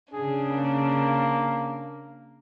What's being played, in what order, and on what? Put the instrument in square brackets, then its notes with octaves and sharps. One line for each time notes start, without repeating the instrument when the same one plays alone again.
[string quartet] C#3 D4 [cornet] G#4
[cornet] A#3